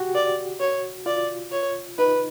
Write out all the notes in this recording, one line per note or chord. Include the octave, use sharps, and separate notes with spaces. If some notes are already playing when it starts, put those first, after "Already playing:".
Already playing: F#4 G4
D5
C#5
F4 D5
C#5
D#4 B4